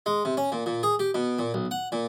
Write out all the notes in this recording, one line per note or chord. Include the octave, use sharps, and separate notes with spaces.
G#3
C3
C#4
A#2
A#2
G#4
G4
B2
A#2
B1
F#5
A#2